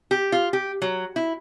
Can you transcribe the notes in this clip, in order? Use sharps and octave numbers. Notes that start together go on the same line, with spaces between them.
G4
F4
G4
F#3
E4